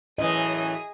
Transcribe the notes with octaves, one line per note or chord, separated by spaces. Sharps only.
F#2 A2 E3 G#4 D#5 D#7